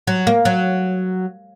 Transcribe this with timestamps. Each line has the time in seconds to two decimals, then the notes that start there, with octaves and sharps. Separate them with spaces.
0.07 F#3
0.27 A#3
0.45 F#3